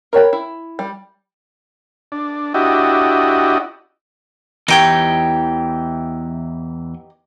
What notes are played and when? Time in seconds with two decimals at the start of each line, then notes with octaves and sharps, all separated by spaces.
0.13 A#4 C#5 G5 B5
0.33 E4
0.79 G3
2.12 D4
2.54 D4 E4 F#4 G4 D#5
4.68 E2 E3 D#4 G4 C#5 G5